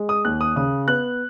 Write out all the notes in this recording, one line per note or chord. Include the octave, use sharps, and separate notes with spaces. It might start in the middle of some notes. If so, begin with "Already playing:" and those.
Already playing: G#3
D#6
D#2 F#6
D#6
C#3 D#6
B3 F#6